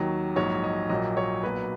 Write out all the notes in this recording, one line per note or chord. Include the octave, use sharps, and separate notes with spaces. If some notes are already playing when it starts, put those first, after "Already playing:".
Already playing: D#2 D#3 F#3
A#1 G#2 F#3 C#5
D#5
A#1 A#2 F#3 D#5
C#5
B1 A#2 F#3 B4